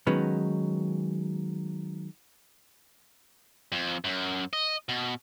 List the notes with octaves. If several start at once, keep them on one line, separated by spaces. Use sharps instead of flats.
D#3 F#3 G#3 B3 C#4 B4
F2
F#2
D#5
B2